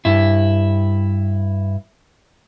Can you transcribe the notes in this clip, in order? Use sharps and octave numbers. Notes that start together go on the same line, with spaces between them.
G2 E4